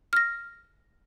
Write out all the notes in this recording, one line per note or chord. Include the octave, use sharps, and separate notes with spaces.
F6 A#6